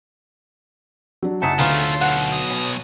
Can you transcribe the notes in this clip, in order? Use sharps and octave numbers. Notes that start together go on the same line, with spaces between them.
F#3 D4
F#1 A3 D#4 G#4 F#5 A5 B6
D2 A3 B3 C#4 D#4 F4 G#4 F5
B1 B2 F#5
D#6
C#4